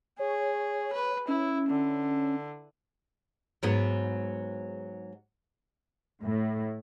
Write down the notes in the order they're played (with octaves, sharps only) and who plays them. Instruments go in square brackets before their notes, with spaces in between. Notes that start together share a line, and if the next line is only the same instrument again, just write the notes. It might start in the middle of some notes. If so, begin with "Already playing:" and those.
[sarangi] G#4 [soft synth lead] C#5
[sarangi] B4
[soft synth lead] C#4 [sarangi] E4
[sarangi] D3
[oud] G#2 F#3 B3
[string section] A2